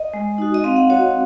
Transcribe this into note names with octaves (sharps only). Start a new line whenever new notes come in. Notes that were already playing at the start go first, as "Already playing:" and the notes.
Already playing: D#5
G#3
D#4 F#4
D#5
C4 F5
F#5
F#4 C#5